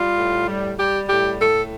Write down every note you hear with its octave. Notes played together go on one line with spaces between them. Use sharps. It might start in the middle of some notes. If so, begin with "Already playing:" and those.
Already playing: G3 F4
A2
G3
G3 G4
A2 G4
A2 A4